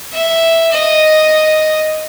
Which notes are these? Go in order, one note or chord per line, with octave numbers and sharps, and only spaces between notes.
E5
D#5